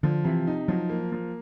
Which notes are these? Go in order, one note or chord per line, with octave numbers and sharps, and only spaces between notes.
D3 F3
C3 E3
D#4
F3 F#3
A#3
F3